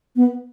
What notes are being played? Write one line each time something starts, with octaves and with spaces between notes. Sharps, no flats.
B3